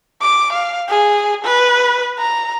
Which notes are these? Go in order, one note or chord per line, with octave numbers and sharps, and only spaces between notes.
D6
F5
G#4
B4
A#5